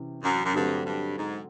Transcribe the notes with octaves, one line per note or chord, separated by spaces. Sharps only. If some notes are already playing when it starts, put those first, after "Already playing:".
Already playing: C3 E3 C#4
F#2
F#2
G2 D3 F#3 A3 C4
G2
G#2